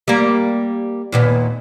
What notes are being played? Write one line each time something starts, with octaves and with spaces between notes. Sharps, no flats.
G3 A#3
D#2 A#2 B3